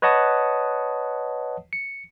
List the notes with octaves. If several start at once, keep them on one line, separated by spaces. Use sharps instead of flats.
B4 C#5 D#5 F#5 A5 D#6
C#7